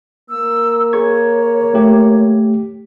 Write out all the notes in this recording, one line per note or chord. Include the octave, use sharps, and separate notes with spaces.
A#3 E6
G#4 C#5 C#6 G#6
A3 G4